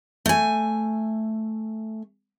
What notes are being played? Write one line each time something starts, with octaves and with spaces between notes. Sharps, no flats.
A3 G#5